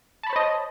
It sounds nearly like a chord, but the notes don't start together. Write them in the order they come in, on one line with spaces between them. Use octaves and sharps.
A5 B5 C#5 C5 D#5